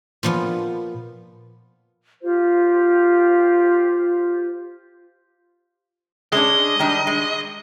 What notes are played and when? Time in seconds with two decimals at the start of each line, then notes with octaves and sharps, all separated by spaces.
0.23 A#2 F3 B3
2.23 F4 G4 C5
6.32 G#3 C#4 D4 D#5
6.79 D#3 G3 D4
7.07 G#3